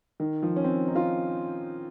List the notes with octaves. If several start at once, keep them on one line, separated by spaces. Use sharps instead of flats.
D#3
F3
C#4
C4
D#4
F4